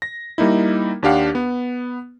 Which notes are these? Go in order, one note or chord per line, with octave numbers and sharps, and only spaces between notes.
A#6
G3 A#3 D#4 E4
D#2 D4 G4 F5 F#5
B3